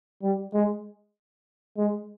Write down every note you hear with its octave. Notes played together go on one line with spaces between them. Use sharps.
G3
G#3
G#3